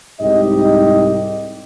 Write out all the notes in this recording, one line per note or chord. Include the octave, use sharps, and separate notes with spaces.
C2 G#2 D#4 G4 D#5